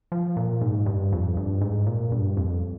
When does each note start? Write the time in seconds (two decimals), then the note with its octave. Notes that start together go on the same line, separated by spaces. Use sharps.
0.12 F3
0.37 A#2
0.61 G#2
0.86 G2
1.12 F2
1.37 G2
1.61 G#2
1.87 A#2
2.12 G2
2.37 F2